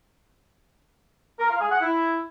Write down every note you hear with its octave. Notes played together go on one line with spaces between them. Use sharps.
A#4
F5
G#4
F#5
E4